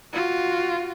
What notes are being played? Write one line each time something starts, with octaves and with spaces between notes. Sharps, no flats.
F4 F#4